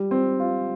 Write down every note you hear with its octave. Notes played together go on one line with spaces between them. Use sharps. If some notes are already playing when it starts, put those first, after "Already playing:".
Already playing: G3
C4
F4